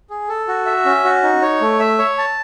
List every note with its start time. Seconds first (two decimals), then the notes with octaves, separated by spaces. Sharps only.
0.10 G#4
0.29 A4
0.48 F#4
0.66 E5
0.85 C#4
1.04 F#4
1.23 D#4
1.42 C#5
1.61 A3
1.79 E5
1.98 C#5
2.18 A5